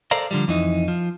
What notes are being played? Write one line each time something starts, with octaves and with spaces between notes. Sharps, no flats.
A4 A#4 C5 D5 F5 A#5
D3 F3 G3
F2 E3 D#4
F3